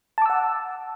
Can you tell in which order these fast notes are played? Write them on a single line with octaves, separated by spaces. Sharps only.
A5 D6 E6 F#5